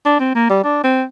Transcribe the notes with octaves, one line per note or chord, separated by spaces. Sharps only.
D4
C4
A#3
G3
D4
C4